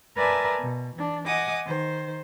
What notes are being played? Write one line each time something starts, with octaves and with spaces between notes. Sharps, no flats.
A#4 B4 D5 E5 G#5 A5
B2
E3 D4
D#5 F#5 G#5 D6 D#6
D#3 C5